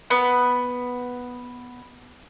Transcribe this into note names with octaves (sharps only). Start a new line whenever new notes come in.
B3 B5